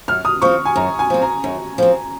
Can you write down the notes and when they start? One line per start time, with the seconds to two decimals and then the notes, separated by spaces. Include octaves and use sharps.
0.08 F#2 F6
0.25 D#6
0.42 F3 C4 C#6
0.65 G#5
0.76 F#2 A#5
0.99 G#5
1.10 F3 C4
1.22 A#5
1.44 F#2
1.78 F3 C4